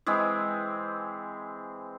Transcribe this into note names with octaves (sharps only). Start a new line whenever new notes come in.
E3 G#3 C4